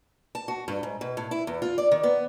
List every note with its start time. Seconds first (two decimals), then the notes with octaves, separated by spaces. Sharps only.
0.35 A5
0.48 F#4
0.68 G2
0.83 G#2
1.01 B2
1.17 A2
1.31 E4
1.47 E2
1.62 F4
1.78 D5
1.92 D#3
2.03 B3